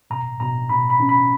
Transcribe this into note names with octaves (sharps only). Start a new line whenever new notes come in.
B2 A#5
B2 A#5
B2 B5
B5
C#4
B5